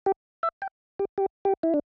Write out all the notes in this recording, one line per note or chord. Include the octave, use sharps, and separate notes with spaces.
G4
E5
G5
G4
G4
G4
E4
D4